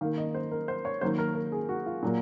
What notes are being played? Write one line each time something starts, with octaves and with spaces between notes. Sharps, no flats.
D#3 A#3 F5
D#5
C5
A#4
C5
C#5
D#3 F#3 A#3 C5
A#4
A#4
G#4
F#4
F4
A#2 F#3 A#3